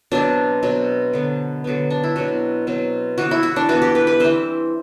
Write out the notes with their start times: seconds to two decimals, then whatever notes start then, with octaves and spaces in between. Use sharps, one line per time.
0.12 B2 F#3 C4 D4
0.63 B2 F#3 C4
1.13 D3 F#3 B3
1.64 D3 F#3 B3
1.90 D4
2.04 E4
2.16 B2 F#3 C4 F#4
2.67 B2 F#3 C4
3.18 E3 B3 F#4
3.31 E4
3.43 F#4
3.56 D4
3.69 E3 B3 F#4
3.82 G4
3.95 B4
4.07 B4
4.20 E3 G3 C4 C5